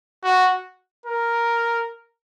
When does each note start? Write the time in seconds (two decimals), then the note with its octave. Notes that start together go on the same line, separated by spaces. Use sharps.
0.23 F#4
1.06 A#4